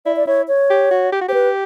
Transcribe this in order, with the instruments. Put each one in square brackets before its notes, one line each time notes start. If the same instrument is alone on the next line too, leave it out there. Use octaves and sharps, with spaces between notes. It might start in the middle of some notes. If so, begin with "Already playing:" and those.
[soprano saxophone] E4 [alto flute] D5
[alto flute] D5
[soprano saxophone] E4 [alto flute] C#5
[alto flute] C#5
[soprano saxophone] G4
F#4
G4
F#4
[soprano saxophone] G4 [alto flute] C5
[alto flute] B4